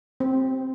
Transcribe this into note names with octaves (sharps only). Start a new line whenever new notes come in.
C4